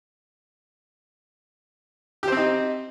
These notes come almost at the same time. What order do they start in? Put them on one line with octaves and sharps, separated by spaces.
G4 C5 C4 D#4